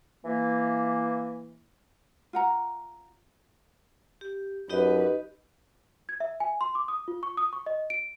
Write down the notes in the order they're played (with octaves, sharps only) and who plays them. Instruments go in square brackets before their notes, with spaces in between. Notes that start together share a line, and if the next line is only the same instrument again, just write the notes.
[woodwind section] E3 A#3
[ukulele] F4 F#5 A#5
[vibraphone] G4
[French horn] F#2 [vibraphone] D#4 G4 D#5 [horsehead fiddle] B4
[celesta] G#6
E5
G#5
C6
D6
D#6
F4
C#6
D#6
C#6
D#5
D7